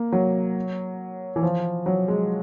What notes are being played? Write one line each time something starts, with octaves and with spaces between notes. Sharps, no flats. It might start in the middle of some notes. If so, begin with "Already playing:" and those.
Already playing: A#3
F#3
E3
F3
F#3
G#3